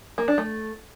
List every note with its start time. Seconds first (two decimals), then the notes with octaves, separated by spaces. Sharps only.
0.18 A#3
0.28 D4
0.38 A3